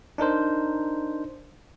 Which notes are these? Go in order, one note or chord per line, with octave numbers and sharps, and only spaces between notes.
D4 D#4 A#4 C5